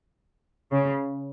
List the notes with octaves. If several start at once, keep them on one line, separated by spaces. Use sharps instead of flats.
C#3